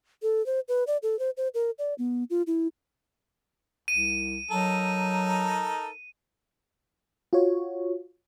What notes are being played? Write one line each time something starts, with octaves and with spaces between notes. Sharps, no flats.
A4
C5
B4
D5
A4
C5
C5
A#4
D5
B3
F4
E4
C2 D#7
F#3 D#4 A4 A#4
F4 F#4 C#5